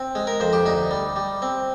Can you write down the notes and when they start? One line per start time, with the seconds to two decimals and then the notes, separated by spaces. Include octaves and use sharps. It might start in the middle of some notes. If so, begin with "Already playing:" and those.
Already playing: C4
0.15 G#3
0.27 A#4
0.40 F2 C5
0.53 G4
0.66 D2 D#4
0.91 G3
1.16 G3
1.42 C4